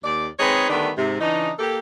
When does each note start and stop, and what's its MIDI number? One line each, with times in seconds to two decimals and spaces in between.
0.04 0.28 39
0.04 0.28 74
0.39 0.69 56
0.39 0.69 60
0.39 0.69 63
0.39 0.69 68
0.39 0.69 71
0.39 0.69 73
0.70 0.89 50
0.70 0.89 51
0.70 0.89 55
0.70 0.89 57
0.70 0.89 59
0.70 0.89 62
0.97 1.17 44
0.97 1.17 48
1.21 1.50 49
1.21 1.50 52
1.21 1.50 62
1.21 1.50 63
1.59 1.79 58
1.59 1.79 67
1.59 1.79 69